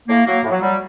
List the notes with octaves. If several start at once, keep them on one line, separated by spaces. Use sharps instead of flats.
A2 A#3
F#3 A#3
A2
F#3
F#3 G3